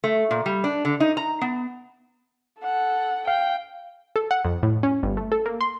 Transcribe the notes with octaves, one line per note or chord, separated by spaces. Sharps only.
A3
A#2
G3
D4
D3
D#4
A#5
B3
A4 F#5
F5 G5
A4
F#5
F2
A2
C#4
G1
A3
A4
A#3
C6